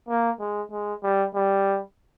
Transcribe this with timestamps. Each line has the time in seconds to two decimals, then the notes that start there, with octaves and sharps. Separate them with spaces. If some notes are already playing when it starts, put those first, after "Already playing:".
0.08 A#3
0.40 G#3
0.72 G#3
1.03 G3
1.35 G3